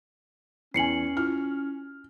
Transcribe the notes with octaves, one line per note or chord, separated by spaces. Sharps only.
E2 C#4 G#5 C7 C#7 F#7
E4 F4 F6